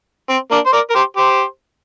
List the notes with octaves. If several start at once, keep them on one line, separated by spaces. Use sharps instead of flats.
C4
A#3 D4
C5
A#4 D5
A#4
G4 C5
G4 C5